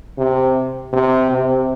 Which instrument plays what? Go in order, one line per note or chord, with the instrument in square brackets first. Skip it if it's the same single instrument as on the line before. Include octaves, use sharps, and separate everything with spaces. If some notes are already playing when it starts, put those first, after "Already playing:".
[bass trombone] C3
C3
C3